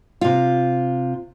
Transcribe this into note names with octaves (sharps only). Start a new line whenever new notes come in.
C3 F4